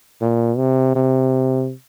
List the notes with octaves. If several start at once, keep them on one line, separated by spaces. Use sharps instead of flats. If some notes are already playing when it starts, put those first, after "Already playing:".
A#2
C3
C3